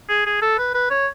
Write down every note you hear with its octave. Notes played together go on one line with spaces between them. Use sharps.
G#4
G#4
A4
B4
B4
C#5